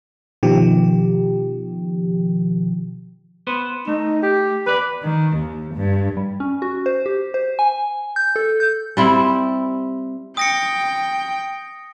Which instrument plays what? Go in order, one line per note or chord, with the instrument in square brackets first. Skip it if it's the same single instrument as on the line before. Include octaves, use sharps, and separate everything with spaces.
[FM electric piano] B2 D#3 F3 G4
[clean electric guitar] B3 B4 C5
[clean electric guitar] A3 [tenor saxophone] D#4
[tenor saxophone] G4
[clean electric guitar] E2 D5 [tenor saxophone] B4
[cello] D#3
D#2
G2
[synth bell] G3
C#4
F#4
C5
G4
C5
G#5
G6
A4
G6
[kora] G3 C4 E4
[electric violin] G5 [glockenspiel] D#6 A#6 C#7